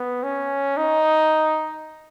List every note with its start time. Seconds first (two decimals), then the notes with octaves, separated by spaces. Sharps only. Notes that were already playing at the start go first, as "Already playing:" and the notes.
Already playing: B3
0.23 C#4
0.77 D#4